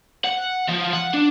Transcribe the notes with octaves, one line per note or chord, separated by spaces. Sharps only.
F#5
F3
F#5
D4